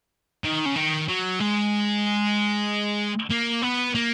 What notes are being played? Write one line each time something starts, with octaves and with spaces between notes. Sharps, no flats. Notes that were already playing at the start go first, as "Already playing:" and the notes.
D#3
C#3
D#3
F#3
G#3
A#3
B3
A#3